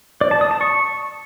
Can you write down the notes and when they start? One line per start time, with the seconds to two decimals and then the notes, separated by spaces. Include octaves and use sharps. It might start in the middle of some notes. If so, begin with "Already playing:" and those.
0.21 D5
0.31 A5
0.41 D#6
0.51 A5
0.61 C#6